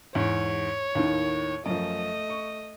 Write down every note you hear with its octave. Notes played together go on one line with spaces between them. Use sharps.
E2 G#2 C#5
D#2 A2 D#3
F#2 F3 A3 D#5
C#6